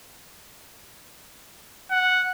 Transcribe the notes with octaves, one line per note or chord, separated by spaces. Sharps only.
F#5